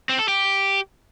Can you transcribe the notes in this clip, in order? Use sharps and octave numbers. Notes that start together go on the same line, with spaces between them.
C4
A4
G4